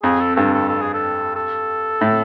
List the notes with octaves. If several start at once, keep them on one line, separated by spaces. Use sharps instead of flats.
F2 G#4
A4
G2 A4
A4
A4
G#4
A4
A4
A2